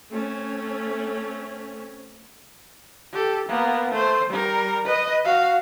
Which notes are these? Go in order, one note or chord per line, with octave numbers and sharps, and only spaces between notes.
A3 C4 C#4
G4 A4
A#3 B3
A3 C5
G3 A#4
B4 D#5
F#4 F5